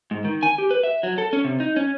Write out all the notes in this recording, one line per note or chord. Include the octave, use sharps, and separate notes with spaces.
G#2
D#3
G#5
G4
B4
E5
F#3
A4
C#4
C3
D#4
C#4